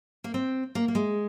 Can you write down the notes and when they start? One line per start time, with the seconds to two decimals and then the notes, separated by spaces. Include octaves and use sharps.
0.24 A#3
0.34 C4
0.75 A#3
0.88 A#3
0.95 G#3